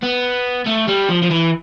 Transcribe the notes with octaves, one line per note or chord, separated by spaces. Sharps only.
B3
A3
G3
F3
F3
E3